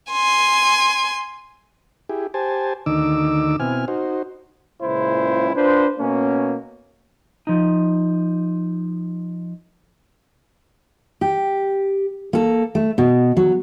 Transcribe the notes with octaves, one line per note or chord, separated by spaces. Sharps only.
G#5 C6
E4 G4 G#4
G4 C5 G#5 A5
D2 D#3 D#4 D6 E6
B2 C4 E4 G#5 F6
D#4 F#4 C5
C#2 A#2 C#3 E4 C5
D4 F4 B4 C5
B2 A#3 C#4
F3 D#4
G4
A#3 A4
A3
B2
F#3